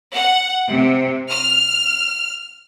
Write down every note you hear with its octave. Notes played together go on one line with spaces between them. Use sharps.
F#5
C3
F6